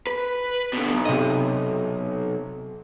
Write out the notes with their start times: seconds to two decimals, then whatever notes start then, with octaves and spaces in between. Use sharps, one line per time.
0.07 B4
0.73 B2 D3
0.92 B1
1.05 C3 D#5